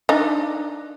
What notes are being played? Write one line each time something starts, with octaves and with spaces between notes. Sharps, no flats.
D4 D#4